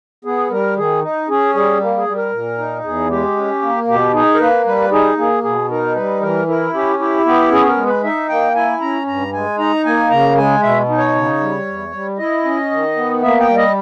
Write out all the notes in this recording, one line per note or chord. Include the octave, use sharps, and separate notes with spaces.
B3 G#4
G3 A#4
D#3 G#4
D#4
C#4 G#4
G3 G#4
A#3
G#4
G3
A#4
A#2
D#4
E2 G#4
G#3 G4
C#4
A#3
B2 G4
D#4 G#4
A#4
A#3 B4
G3 B4
D#4 G#4
A#3 G#4
B2 G#4
D#4 A#4
G3 B4
E3 A#4
E4 A#4
C#4 G4
E4 G4
B3 G4
C#4 G#4
A#4
G#3
B4
D#4 E5
A#3 G5
E4 G#5
C#4 A#5
G2 A#5
G#3 G#5
D#4 A#5
A#3 G#5
C#3 A#5
G#3 G#5
B2 E5
D#4
C#5
C#3
G3
E2
G3
E4 D#5
C#4
D#3
B3
A#3 E5
G5
G3
D#5